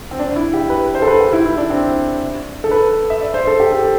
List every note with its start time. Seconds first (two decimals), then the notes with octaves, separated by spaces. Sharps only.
0.11 C4
0.19 D4
0.36 E4
0.53 G4
0.70 B4
0.95 C5
1.02 A4
1.08 B4
1.20 G4
1.33 E4
1.46 E4
1.57 D4
1.70 C4
2.64 A4
2.71 B4
3.10 E5
3.22 D5
3.34 C5
3.47 A4
3.60 G4
3.72 A4